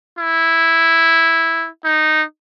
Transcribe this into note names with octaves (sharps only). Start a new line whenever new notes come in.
E4
D#4